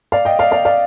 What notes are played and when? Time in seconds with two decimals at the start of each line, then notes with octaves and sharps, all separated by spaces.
0.12 D5 F5
0.25 D#5 G5
0.39 D5 F5
0.51 D5 F5
0.65 D5 F5